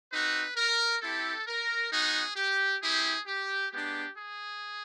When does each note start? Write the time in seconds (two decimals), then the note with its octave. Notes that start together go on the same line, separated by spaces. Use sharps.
0.12 C4 D#4 F#4 B4
0.57 A#4
1.02 C4 E4 G4 A4
1.47 A#4
1.92 B3 D#4 F#4 G#4
2.36 G4
2.82 C4 E4 G4 G#4
3.26 G4
3.71 G#3 B3 D4 G4
4.16 G#4